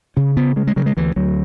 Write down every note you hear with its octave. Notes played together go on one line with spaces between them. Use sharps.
C#3 C#4
C#3 B3
C#3 G#3
G#3
C#3 F#3
G#3
D2 E3
D2 F#3